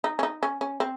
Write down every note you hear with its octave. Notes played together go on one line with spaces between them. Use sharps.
D#4
C#4
D#4
C#4
C#4
C4